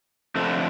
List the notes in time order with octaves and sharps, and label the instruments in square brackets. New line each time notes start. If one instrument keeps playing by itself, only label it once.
[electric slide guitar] F2 D3 A3